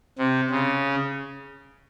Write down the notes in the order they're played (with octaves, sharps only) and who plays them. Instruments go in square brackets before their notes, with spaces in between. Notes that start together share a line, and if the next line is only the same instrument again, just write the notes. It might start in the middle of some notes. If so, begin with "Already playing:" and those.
[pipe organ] C3
C#3